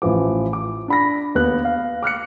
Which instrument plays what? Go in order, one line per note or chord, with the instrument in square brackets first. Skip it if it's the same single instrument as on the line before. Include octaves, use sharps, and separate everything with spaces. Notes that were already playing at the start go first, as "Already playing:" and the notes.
[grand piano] A1 E3 F3 D6
D6
D4 B5 A#6
D#2 B3 F#6
F5
D6 F6 F#6 C#7